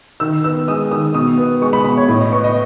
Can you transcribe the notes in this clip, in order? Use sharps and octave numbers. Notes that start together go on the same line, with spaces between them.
D#3 E6
B3 E6
G#3 D#6
D#3 D#6
B2 D#6
B3
G#3 C#6
B5
B2 B5
C#5
A2
D#5
B3 C#6
D#5